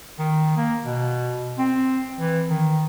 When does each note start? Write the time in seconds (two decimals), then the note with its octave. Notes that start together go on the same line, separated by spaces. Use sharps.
0.19 D#3
0.57 A#3
0.84 B2
1.59 C4
2.20 E3
2.49 D#3